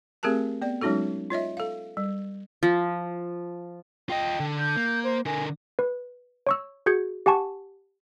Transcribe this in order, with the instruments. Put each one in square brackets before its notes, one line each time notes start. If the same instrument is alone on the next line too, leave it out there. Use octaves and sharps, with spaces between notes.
[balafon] A3 C4 G4 G#4 A#4 A5
B3 D5
F#3 G#3 C#4 D#4 F#4 A4
F4 C#5 D#5 E5
A4 F5
G3
[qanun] F3
[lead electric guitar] F4 D#5 [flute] G5
[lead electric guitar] D3
[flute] G6
[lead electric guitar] A#3
[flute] C5
[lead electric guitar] D3 A#4 [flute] G#5
[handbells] B4
C#5 C#6 E6
F#4 G#4 G6 G#6 C#7
G4 F#5 G#5 A5 C#6